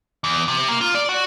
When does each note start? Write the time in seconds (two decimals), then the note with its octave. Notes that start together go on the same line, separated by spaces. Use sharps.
0.24 E2
0.48 C3
0.68 A#3
0.81 F4
0.95 D5
1.09 F#4